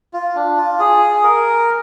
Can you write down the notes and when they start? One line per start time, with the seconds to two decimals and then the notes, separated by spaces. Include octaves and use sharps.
0.13 F4
0.35 D4
0.57 F4
0.79 G#4
1.24 A#4